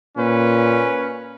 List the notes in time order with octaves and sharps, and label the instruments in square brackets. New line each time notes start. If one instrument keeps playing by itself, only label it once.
[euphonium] A#2 [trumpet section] C#4 B4